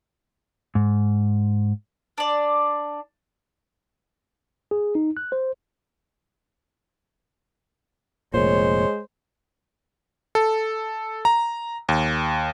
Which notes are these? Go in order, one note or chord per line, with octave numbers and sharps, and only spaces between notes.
G#2
D4 D5
G#4
D#4
F#6
C5
F1 A#2 G#3 C5 C#5
A4
A#5
D#2